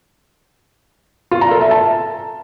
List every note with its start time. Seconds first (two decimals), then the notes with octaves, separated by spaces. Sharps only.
1.31 F4
1.41 A#5
1.51 A4
1.61 E5
1.71 A5